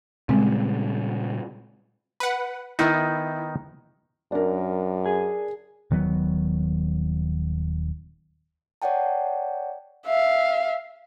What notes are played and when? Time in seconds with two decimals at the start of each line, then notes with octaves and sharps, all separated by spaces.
0.29 A#2 C#3 G3 G#3 C4
2.20 B4 F#5
2.79 D#3 B3 D#4 E4
4.32 F#2 D4 A#4
5.06 G#4 G#5
5.91 D#1 D#3 F#3 B3
8.82 C#5 D5 F#5 G5 A5
10.06 E5 F5